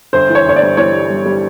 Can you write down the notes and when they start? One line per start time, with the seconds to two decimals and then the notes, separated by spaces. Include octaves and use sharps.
0.13 G1 C5
0.30 E3
0.35 C#5
0.45 G1 C#5
0.56 D5
0.62 G2
0.77 E3 C#5
0.93 G3
1.10 G3
1.26 G3